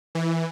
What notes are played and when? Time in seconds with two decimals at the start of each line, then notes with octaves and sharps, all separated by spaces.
0.15 E3